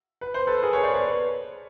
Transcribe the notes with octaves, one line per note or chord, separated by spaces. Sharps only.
B4
C5
A4 B4
G#4 A#4
B4 C#5
C5 D5
B4 C#5